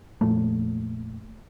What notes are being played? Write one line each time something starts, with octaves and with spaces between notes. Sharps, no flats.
A#1 F2 A#2 A3